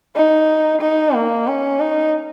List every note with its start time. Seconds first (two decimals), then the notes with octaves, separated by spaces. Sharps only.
0.16 D#4
0.81 D#4
1.14 A#3
1.47 C#4
1.80 D#4